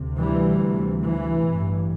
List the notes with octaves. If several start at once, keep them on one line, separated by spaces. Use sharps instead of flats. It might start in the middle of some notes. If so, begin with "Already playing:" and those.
Already playing: D2 C3
E3 G3
E3
A1 G2